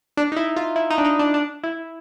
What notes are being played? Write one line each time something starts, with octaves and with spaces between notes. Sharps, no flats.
D4
D#4
E4
F4
E4
D#4
D4
D#4
D4
D4
E4